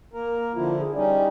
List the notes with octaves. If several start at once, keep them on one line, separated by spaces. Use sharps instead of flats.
A#3 A#4
D3 F3 E4 F4
G#4
G3 C#4 D#4 D5